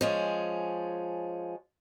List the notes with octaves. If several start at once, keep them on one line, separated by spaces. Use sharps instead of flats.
F3 G#3 C#4